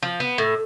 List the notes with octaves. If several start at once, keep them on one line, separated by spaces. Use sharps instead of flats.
F3
B3
A2